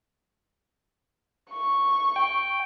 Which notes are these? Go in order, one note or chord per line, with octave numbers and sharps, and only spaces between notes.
C#6
G5